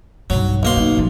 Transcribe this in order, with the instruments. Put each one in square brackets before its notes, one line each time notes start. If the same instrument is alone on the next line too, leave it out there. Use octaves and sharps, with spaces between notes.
[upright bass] B1 G2 [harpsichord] F#3
[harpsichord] B1 A#3 C6
[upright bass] D#4
A1 F3